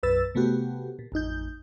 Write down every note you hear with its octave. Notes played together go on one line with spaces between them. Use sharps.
B1 F#2 B4 E6 A6
C3 A3 B3 F#4 G4
A#2
A1 F2 D#4 G6